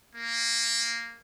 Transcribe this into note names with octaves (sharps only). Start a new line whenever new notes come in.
A#3